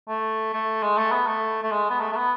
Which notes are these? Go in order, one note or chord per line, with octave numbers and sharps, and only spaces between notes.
A3
A3
G#3
A3
B3
A3
A3
G#3
B3
A3
A3
B3